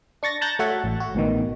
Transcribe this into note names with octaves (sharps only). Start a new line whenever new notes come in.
D4 C#6 A6 A#6
A5 A#5 F#6 G6 A6 A#6
A3 F#4 C#5 E5 F#5
A1
F#4
A1 B2 D#3